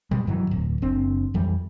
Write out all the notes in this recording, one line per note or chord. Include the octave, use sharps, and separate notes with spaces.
B2 G3 G#3
G2 D#3 E3 F#3
D1
F#1 C4 D4
F2 E3 G3